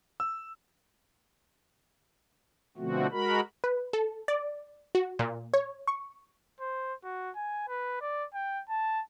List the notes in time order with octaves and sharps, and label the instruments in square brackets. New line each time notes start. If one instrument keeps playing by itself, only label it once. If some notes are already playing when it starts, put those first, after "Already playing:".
[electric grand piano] E6
[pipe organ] B2 D3 F3 A3 C4 F#4
G#3 F#4 A#4 B5
[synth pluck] B4
A4
D5
F#4
A#2
C#5
C#6
[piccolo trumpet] C5
F#4
G#5
B4
D5
G5
A5